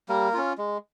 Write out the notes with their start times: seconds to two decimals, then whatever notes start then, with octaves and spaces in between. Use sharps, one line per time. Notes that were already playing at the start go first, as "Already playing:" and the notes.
0.09 G3 A#3 A#4
0.34 C#4 F4
0.58 G#3